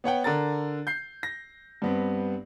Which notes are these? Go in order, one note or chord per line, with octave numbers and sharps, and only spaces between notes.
B3 C#5 F#5 G5
D3 A#4 A#5 A6
G6 C7
A#6
G2 B3 C4